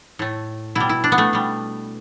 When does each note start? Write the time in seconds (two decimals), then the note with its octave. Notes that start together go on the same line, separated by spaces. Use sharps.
0.19 A2 A3
0.75 B2 G3 E4
0.89 E4
1.04 D4
1.12 B3
1.18 A3
1.33 B2 G3